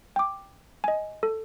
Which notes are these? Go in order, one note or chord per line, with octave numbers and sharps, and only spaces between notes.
G5 D6
D#5 G#5
A4